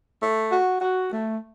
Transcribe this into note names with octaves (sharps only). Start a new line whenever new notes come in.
A3
F#4
F#4
A3